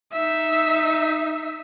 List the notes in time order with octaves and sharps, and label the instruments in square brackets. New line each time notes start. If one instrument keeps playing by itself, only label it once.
[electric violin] D#4 E5